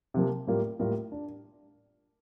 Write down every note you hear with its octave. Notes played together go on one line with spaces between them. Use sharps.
C3 F3 A#3
A2 G3 A#3 F4 A#4
A2 G3 A#3 F4 A#4
D4